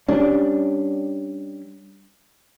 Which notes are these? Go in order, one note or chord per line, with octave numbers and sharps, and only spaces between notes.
G3 C#4 D4